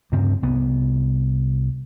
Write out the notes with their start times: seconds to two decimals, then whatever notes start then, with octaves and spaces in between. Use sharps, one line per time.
0.12 D2 G2 C#3 C4
0.42 C2 B3